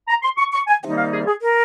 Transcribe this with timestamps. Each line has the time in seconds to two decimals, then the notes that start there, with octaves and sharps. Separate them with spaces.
0.08 A#5
0.23 C6
0.38 C#6
0.52 C#6
0.67 G#5
0.82 C3 D#3 G3 A#3 D#4 G5
0.97 F5
1.11 G#4
1.26 G#4
1.41 A#4